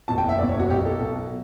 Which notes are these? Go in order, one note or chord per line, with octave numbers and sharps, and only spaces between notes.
F#1 E2 B2 A5
G5
E5
F#1 E2 B2 D5
C#5
F#4
B1 B2 G4
A4
B1 B2